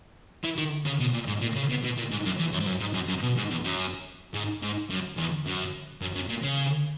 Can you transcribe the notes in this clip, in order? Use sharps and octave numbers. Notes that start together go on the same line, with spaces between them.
E3
D#3
C#3
B2
A#2
G#2
A#2
C#3
B2
B2
A#2
G#2
F#2
E2
F#2
G#2
F#2
G#2
F#2
F#2
B2
G#2
E2
F#2
G#2
G#2
F#2
E2
F#2
F#2
F#2
A#2
C#3